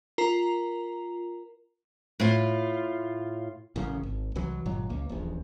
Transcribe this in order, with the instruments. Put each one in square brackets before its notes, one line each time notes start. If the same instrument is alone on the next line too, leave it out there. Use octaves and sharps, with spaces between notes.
[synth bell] F4 A#4 A#5
[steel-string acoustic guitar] A2 F4
[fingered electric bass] A1 F#2 C#3
G#1
C2 E3 F#3
G1 A#2 F#3 G#3
C#2 A#3
D#1 A#1 E2